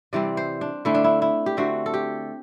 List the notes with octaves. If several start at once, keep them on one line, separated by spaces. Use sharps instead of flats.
C3 E3 G3 C4 D5
C5
D4
D3 A3 C4 E4
D4
E4
E4
G4
D3 A3 C4 F#4
A4
G4